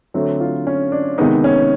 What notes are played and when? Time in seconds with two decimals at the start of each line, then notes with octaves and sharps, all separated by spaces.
0.14 D3 F#3 A3 C4
0.40 F4
0.67 C#4
0.92 D4
1.18 C3 D#3 G#3 B3 D#4
1.44 C#4